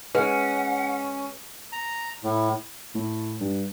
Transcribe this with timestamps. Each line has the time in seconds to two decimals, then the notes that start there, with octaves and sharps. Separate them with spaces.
0.15 G#3 C#4 B4 F#5
1.72 A#5
2.24 A2
2.95 A2
3.41 G2